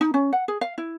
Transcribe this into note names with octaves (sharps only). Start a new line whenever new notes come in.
D#4
C#4
F#5
G#4
F5
E4